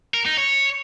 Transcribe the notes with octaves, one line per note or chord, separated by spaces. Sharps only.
A#4
D#4
C#5